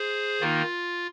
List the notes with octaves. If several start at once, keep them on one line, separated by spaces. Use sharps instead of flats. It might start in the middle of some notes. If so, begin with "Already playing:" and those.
Already playing: G#4 C5
D#3 A#3 D#4 F4